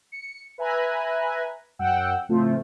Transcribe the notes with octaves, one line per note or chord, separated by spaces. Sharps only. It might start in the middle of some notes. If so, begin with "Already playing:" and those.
C#7
B4 E5 G#5 A#5 B5 F#6
F#2 F#5 G5 E6
A2 C#3 F3 A3 C4 F4